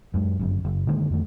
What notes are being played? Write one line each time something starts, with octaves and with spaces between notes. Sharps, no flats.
F#2 G#3
G1 F#2
F#1
D3 D#3 G#3 A#3
F2 D#3 A3